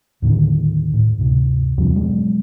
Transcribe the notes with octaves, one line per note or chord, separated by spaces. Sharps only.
D#2 A2 D3 D#3
A2
D2 G2 C3
E2 G2 C3 F3
B2 F#3 G#3